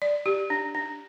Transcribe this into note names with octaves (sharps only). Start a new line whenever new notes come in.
D5
G4
D4
D4